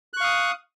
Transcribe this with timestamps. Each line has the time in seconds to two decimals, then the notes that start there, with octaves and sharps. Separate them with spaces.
0.13 F#6
0.17 C#6
0.20 F5
0.24 D#6